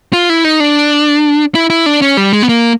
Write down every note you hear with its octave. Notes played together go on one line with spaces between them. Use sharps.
F4
E4
D#4
D4
E4
E4
D4
C#4
G3
G#3
B3
A#3